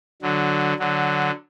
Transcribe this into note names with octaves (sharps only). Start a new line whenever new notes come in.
D3 F#3
D3 F#3